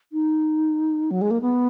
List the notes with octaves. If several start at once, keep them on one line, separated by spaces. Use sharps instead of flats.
D#4
F#3
G#3
A#3
B3